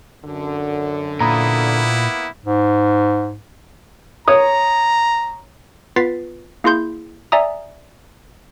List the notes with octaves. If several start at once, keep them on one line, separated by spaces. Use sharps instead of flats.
F#2 D3
A#2 A#3 B3 E4 A#5 B5 D#6
G#2
C#5 A#5 D#6
B3 F4 B4 A6 B6 C7
A#3 E4 G#4 C6 G6
D5 E5 G#5 A#5 D#6